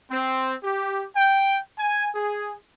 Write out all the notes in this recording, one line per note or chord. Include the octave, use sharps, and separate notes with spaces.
C4
G4
G5
G#5
G#4